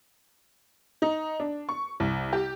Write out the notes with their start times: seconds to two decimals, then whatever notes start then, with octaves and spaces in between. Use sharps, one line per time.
1.02 D#4
1.40 D4
1.69 C#6
2.00 C2
2.33 G4